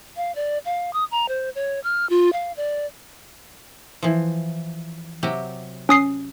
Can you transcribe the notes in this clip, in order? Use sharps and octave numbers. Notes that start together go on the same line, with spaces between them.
F5
D5
F5
D#6
A#5
C5
C#5
F6
F4
F5
D5
E3 F3
C3 F#3 G4
C#4 D#6 C7